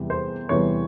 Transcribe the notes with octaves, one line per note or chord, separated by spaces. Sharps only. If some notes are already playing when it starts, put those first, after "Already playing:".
Already playing: E2 C3 E3 G3
C5
E2 C3 E3 G3 C#5